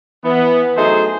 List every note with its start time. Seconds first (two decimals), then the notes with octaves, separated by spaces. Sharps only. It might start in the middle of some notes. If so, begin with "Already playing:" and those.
0.25 E3 B3
0.77 F#3 A3 D#4 G#4 C5